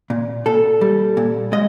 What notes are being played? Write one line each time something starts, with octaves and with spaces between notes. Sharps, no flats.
A#2
A#2 A4
G3
A#2
G#3 D#5